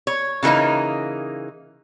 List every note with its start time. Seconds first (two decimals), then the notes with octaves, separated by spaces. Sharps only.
0.07 C#5
0.43 C#3 E3 A3 A#3 D#4